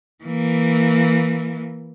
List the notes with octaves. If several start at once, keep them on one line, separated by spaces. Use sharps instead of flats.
E3 A#3